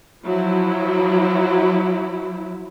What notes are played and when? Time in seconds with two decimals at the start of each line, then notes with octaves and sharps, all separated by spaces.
0.24 F3 F#3 E4